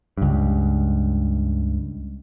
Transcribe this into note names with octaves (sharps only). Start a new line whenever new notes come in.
C#2 G2